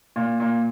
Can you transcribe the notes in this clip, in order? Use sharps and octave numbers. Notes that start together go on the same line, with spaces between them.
A#2
A#2